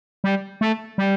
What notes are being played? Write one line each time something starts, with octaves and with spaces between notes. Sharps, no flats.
G3
A3
G3